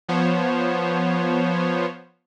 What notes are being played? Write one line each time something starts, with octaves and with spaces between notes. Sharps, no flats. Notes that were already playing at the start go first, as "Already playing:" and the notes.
F3 B3 C5 C#5